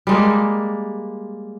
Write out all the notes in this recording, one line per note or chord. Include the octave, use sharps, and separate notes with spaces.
G3 G#3 A#3